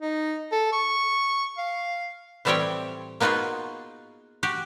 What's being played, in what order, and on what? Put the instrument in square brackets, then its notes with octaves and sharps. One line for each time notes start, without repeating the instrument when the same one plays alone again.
[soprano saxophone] D#4
A4
C#6
F5
[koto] A2 E3 G3 C4 C#5 G5
A#3 B3 D#4 F4 F#4 G#4
F#4 G4